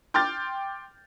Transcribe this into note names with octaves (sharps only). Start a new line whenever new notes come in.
G5 C6 D6 F6 G6 A6